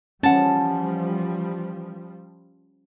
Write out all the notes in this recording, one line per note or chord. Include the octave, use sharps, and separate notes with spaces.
E3 F3 G3 C#4 F#5 A5